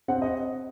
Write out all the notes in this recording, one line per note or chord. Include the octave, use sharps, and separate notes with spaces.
C4 F#5
D#5